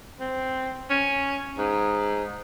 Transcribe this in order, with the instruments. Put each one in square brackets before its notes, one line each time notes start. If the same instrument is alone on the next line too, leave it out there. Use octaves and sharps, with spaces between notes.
[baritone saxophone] C4
C#4
G#2